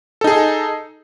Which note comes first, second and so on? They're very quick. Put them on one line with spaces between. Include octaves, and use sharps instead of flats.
A4 D#4 G#4